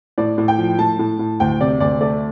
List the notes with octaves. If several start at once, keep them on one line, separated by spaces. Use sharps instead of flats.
A2 D5
A2
G5
F3
A2 A5
A2
A2
D2 G5
C3 D5
D2 D5
A3 D5